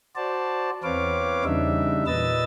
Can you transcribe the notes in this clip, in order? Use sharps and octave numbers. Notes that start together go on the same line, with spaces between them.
F#4 C5 D5 A5
E2 C4 B4 C#5 F5 D6
E2 C#3 G3 D4 D#4 E5
A#2 B4 D#5 E6 A6